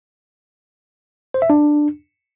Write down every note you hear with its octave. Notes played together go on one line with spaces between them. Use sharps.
C5
E5
D4